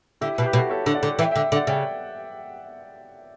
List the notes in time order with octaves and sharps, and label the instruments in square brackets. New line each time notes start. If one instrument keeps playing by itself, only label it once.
[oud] D3 [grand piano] E4 G4
[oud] B2
[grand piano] G4 B4
[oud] B2
[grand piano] F#4 A4
A4 C#5
[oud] D3
[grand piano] D5 F#5
[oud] D3
[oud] E3 [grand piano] E5 G5
[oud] D3 [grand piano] E5 G5
[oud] D3
[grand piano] D5 F#5
[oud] C#3 [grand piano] E5 G5